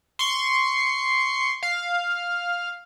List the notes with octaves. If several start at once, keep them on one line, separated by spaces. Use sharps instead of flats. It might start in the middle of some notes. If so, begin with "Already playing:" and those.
C6 C#6
F5